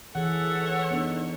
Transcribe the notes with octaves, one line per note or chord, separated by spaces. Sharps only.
E3 G#4 A4 C#5 E5 F#5
B3 D4 D#4